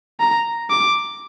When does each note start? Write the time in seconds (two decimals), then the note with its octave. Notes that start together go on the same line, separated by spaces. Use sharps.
0.20 A#5
0.70 D6